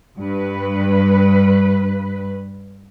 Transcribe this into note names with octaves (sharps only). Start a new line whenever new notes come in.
G2 B4